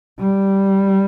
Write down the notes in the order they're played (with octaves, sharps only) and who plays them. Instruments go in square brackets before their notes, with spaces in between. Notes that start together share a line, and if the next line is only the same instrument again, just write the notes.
[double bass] G3